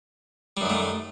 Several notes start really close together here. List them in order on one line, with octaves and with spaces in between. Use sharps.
G3 F#2 D#3 A3